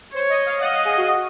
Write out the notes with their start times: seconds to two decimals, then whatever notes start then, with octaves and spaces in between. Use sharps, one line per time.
0.14 C5 C#5
0.30 D#5
0.46 F5
0.61 D#5 F#5
0.73 F5
0.85 G#4
0.97 F#4
1.08 F#4